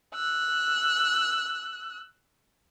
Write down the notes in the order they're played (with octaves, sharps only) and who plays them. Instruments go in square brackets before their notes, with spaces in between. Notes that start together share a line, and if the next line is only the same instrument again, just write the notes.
[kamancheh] E6 F#6